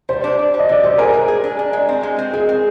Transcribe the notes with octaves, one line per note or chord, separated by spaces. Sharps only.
G3 C5
D4
D4
G3
D#5
D3 D5
G3 C5
G#4 A#4
G#3
G#4
D4
D4
G#3
C4
G#3
C4
G#3 G#4
C4